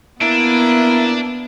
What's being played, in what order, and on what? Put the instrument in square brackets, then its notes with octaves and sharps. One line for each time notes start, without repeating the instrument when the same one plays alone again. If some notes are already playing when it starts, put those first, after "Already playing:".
[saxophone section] A#3 E4 [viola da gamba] B3 [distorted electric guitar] D4